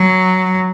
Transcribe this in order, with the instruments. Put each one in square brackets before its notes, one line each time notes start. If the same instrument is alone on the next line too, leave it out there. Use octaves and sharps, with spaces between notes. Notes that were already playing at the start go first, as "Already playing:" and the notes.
Already playing: [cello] F#3